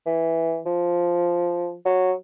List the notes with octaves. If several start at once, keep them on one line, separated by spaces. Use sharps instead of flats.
E3
F3
F#3